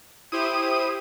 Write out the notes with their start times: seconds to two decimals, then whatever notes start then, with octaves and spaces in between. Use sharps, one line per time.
0.32 E4 G4 C5 D#6